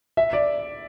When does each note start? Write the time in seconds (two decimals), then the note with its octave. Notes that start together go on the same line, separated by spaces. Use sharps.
0.17 E5
0.33 D5